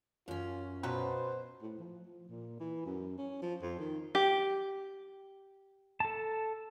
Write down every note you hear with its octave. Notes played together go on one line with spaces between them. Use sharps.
F#2 C#4 F4
B2 F3 F#3 B4 C5
A2
F3
F3
A#2
E3
F#2
C#4
F3
F2
D#3
G4
A4 A5